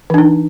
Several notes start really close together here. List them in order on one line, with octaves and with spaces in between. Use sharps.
E3 D4 D#4